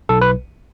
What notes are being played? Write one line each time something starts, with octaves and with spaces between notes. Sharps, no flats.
B1 A4
B4